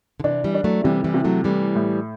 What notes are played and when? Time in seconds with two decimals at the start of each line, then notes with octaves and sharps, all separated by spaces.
0.20 D3
0.24 C3 E3 D4
0.44 E3 G3
0.54 D4
0.64 F#3 A3
0.84 C3 E3 G3
1.04 E3 G3
1.14 C3
1.25 F#3 A3
1.44 E3 G3 A3
1.75 A2